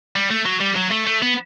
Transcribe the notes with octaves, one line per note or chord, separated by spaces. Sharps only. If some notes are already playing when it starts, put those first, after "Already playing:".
G3
A3
F#3
G3
F#3
A3
A3
B3